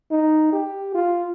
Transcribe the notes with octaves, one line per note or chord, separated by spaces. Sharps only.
D#4
G4
F4